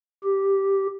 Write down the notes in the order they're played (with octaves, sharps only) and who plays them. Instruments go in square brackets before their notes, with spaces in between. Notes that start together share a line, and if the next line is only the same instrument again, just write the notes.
[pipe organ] G4